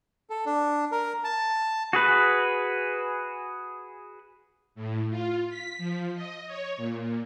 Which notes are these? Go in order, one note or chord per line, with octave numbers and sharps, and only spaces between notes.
A4
D4
A#4
A5
F#4 G#4 B4
A2
F4
B6
F3
D#5
C#5
A#2